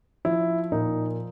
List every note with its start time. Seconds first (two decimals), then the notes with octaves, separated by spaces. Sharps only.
0.25 F3 E4
0.72 A#2 D#4